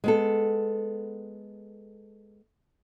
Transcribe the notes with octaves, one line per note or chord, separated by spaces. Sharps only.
G#3 B3 A4